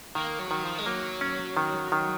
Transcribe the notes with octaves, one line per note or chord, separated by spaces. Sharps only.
D#3 A#3
F#3
D#3
F3
G#3
F#3 A#3
C#4
D#3
D#3